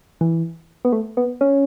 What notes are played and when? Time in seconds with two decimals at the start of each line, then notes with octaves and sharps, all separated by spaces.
0.21 E3
0.85 B3
0.92 A3
1.17 B3
1.41 C#4